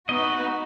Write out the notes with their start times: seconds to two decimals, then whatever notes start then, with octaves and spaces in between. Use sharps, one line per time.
0.08 B3 D#4 F#4 D#5
0.24 B4